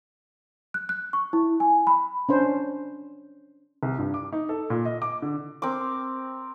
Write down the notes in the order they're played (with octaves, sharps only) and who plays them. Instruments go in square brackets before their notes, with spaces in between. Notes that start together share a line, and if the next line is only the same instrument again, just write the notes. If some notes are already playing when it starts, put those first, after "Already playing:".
[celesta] F#6
F#6
C#6
E4
G#5
B5
[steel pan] C#4 D4 C5
[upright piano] C2
G2
D6
D#4
A4
A#2
D#5
D6
D3
[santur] C4 A#4 D6